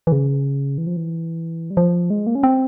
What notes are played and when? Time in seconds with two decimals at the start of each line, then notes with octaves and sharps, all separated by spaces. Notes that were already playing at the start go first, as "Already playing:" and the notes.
0.07 E3
0.12 C#3
0.78 E3
0.87 F3
0.97 E3
1.70 G3
1.77 F3
2.10 G#3
2.27 A#3
2.35 C#4
2.43 C4